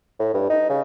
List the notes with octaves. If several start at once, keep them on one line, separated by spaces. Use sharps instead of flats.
A2
G2
D#4
C#3